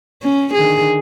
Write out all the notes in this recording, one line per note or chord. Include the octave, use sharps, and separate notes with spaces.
C#4
D3 D#3 G#4